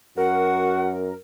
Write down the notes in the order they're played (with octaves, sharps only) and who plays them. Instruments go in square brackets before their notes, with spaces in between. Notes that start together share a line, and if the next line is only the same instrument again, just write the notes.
[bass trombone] F#2 [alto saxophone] F#4 [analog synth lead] A#4 [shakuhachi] F#5